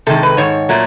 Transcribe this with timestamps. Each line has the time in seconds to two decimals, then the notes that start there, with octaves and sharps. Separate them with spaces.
0.07 C3 D#3 G#3 A4
0.23 B4
0.37 G#2 D#3 C#5
0.69 A#2 F#3 A3